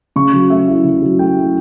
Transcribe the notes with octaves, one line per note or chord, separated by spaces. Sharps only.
C#3 C#6
F#3
A3 E5
E4
C#3
F#3
A3 G5
E4